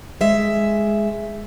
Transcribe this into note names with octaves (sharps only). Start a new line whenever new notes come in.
G#3 E5